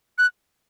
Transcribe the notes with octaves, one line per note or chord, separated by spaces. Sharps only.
F#6